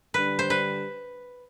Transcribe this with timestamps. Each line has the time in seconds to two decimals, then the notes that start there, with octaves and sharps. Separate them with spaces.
0.14 D3 G3 D4 B4
0.39 C5
0.50 B4